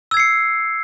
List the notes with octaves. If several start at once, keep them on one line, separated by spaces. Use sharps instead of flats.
E6 G#6 C7 C#7